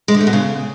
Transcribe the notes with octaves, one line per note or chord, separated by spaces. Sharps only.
G#3
D3
A3
B2
C#3